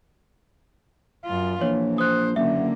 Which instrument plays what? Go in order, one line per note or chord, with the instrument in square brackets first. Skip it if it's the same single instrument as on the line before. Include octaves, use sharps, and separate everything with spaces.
[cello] F#2 F4
[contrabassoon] A#1 [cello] E3 [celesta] C#5
[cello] C5 [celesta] D#6 F#6
[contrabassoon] F#1 [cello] D3 A#3 [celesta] E5